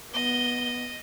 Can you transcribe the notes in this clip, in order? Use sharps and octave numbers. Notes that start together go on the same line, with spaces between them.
B3 D#5 G7